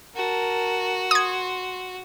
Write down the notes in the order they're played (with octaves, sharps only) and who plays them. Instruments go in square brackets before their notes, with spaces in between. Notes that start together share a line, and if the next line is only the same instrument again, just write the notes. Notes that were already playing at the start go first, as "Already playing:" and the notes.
[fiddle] F#4 [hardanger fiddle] A#4 A5
[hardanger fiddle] C6 [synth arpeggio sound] D#6 G#6